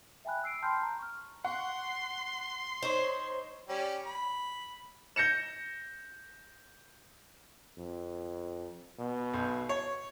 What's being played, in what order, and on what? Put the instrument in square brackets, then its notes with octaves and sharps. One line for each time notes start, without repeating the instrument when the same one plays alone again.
[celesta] E5 G5 G#5 B5 F#6
E6 C7 D7
G5 A5 B5 C6 F6 G6
A#5
C#6 F6
[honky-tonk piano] F#5 C#6 [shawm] C6
[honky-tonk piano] D#4 [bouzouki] C5 C#5
[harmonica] G3 C#4
B5
[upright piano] G6 A#6 C#7 E7
[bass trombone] F2
B2
[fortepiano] B1
C#5